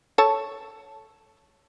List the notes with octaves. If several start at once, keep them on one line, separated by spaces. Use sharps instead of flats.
A4 C#5 A5